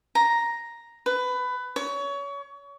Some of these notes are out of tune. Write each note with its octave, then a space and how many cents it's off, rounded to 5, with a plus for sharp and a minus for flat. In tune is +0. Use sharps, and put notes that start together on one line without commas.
A#5 +5
B4 +20
C#5 +25